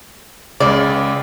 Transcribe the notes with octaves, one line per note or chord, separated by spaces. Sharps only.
C#2 C#3 D5